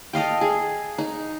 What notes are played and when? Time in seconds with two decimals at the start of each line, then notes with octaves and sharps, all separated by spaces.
0.13 A4 D#5 F5 G5
0.41 G#4
0.98 D#4